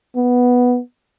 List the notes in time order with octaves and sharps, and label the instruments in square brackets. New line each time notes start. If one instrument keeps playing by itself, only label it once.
[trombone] B3